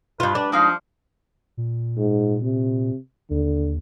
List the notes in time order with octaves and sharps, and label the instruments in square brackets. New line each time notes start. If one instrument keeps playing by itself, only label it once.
[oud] G2 F4 [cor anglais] B4
[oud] D4
[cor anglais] F3 [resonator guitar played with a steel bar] G#3 D#4 F5
[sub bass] A#2
[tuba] G#2
C3
[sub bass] D#2 [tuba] D3